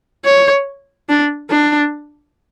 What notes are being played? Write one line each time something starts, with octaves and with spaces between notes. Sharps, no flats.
C#5
D4
D4